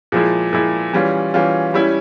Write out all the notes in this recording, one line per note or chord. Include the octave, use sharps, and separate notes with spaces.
A#2 F3 G#3 E4
A#2 F3 G#3 E4
E3 G3 C#4 F4
E3 G3 C#4 F4
G3 C#4 E4